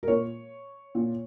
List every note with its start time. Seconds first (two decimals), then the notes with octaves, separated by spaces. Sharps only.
0.03 A#4
0.08 A#2 C#5
0.95 A#2